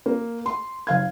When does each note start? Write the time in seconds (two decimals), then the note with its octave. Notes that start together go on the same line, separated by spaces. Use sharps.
0.06 A#3
0.46 C6
0.87 F#1 F5 G#6